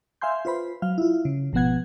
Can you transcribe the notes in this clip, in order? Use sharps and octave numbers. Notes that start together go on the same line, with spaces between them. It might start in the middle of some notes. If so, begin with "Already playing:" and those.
E5 F5 G#5 C6 G6
F4 B4 C5 B5
F#3 F5 F6
E4 F4
C#3
G#1 B2 F3 B3 F#5 G#6